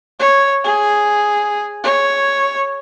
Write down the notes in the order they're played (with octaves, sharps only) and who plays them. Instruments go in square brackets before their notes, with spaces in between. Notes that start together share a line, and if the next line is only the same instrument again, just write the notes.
[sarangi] C#5
G#4
C#5